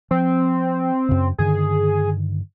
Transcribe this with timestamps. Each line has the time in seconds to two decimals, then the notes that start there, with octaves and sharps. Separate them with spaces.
0.11 F3 C4
1.09 F#2 C#3
1.38 G2 D3 D#3 G#4